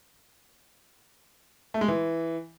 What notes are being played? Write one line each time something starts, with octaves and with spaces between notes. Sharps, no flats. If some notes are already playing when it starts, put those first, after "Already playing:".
A3
G#3
E3